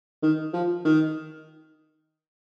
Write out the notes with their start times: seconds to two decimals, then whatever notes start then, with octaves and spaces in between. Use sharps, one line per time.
0.23 D#3
0.53 F3
0.85 D#3